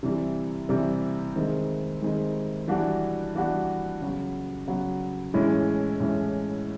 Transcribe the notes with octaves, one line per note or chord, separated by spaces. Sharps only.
C3 E3 G3
C3 E3 G3
D#3 G#3 C4 D#4 G#4
D#3 G#3 C4 D#4 G#4
E3 G3 B3 D4 F#4
E3 G3 B3 D4 F#4
C#3 F#3 B3
C#3 F#3 B3
A2 E3 G#3 C#4 E4
A2 E3 G#3 C#4 E4